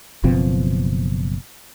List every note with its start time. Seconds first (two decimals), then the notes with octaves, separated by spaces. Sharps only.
0.24 F#1 B2 F3 C4